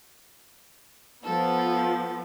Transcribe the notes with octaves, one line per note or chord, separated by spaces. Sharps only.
F3 B3 A4